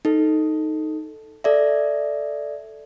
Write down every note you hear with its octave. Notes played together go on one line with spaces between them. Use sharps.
D#4 A4
A4 D5 E5